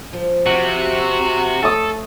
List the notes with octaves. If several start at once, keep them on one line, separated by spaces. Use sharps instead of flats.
F3
C3 F#4
A3 A4 D#6